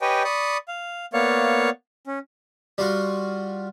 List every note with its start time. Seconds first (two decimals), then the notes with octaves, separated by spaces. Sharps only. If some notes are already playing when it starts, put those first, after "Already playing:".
0.01 G4 B4 C#5 D#5 G5 G#5
0.24 D5 B5 C#6 D#6
0.68 F5
1.13 A#3 B3 C#5 D5 F5 C#6
2.07 C#4
2.78 G3 F4 F#4